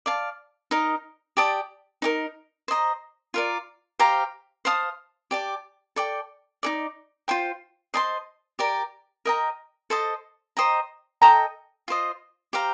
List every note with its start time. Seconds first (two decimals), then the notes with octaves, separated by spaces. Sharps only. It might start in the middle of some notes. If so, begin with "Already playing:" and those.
0.06 D5 F5 A5
0.71 D#4 A#4 D#5
1.37 G4 D5 A5 D#6
2.02 D#4 G4 A#4
2.68 C5 D#5 A#5
3.34 F4 A#4 D5
3.99 G4 C5 F5 A#5
4.65 C5 F5 A5 D#6
5.31 G4 D5 A5
5.96 A4 D5 G5
6.63 D#4 A4 D5
7.28 F4 C5 G5
7.94 C5 D#5 A5 C6
8.59 G4 A#4 D5
9.25 A#4 D#5 G5 A#5
9.90 A4 C5 D#5 A5
10.57 C5 D#5 G5 A#5
11.22 A4 D#5 G5 A#5
11.88 F4 C5 D#5
12.53 G4 C5 F5 A#5